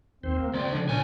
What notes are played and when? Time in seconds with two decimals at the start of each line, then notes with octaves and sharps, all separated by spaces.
0.23 D#2 C4 C5
0.37 A#3
0.53 C#2 C#3 C5 D5 G5
0.72 D3 F3 D4
0.89 B1 A#2 C#4 C#5 G#5